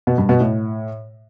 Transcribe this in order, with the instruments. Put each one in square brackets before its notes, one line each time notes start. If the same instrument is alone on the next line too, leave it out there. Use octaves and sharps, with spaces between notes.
[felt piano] B2
G2
B2
A2